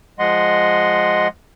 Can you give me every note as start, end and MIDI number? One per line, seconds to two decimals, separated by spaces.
0.19 1.28 53
0.19 1.28 56
0.19 1.28 75
0.19 1.28 78
0.19 1.28 84